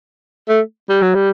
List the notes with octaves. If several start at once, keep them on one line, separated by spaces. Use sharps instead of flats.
A3
G3
F#3
G3